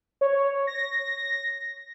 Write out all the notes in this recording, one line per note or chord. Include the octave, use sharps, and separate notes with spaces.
C#5
A#6